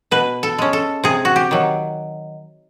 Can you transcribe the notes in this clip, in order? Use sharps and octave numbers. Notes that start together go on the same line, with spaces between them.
B2 B4
A4
G#3 C#4
A4
C3 G#4
F#4
G4
D#3 F#3